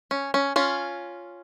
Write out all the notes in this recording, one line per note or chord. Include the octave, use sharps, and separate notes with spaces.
C#4
C#4
C#4 F4